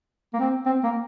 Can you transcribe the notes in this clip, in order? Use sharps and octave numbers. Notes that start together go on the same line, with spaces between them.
A#3
C4
C4
A#3